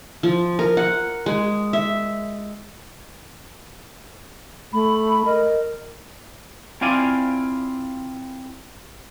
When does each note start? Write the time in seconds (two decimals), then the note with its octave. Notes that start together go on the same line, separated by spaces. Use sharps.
0.23 F3
0.59 A#4
0.77 F#5
1.26 G#3
1.73 E5
4.73 A3 B5
5.26 A#4 D#5
6.81 C4 E4 F4 D5 F5 G#5